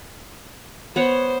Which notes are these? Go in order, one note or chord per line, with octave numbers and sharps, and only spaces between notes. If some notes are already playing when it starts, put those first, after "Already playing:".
B3 C5 C#5 F#5